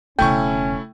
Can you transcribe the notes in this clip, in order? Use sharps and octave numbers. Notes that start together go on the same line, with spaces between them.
E1 C#3 A3 C#4 E4 G5 C#6